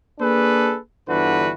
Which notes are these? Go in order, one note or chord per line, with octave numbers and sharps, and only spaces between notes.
A#3 D4 G#4 A4 B4
G1 D3 E3 F#4 B4